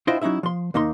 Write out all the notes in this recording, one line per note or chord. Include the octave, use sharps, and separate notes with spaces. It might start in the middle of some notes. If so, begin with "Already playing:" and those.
D4 E4 F4 C5 D#5 G5
F#3 C#4 D#4 E4 E5
F3 C6
D#2 A#3 D#4 C6